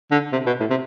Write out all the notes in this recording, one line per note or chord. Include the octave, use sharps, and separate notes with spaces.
D3
C3
B2
A2
C3